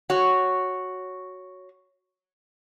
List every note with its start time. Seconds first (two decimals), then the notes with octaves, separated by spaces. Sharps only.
0.10 F#4 C#5